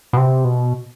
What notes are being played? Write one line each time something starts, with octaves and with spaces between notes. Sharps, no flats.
B2
C3
B2